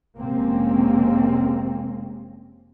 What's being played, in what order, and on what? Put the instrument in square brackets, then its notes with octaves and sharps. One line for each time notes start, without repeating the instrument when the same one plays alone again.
[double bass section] F1 C3 G#3 A#3 C4 C#4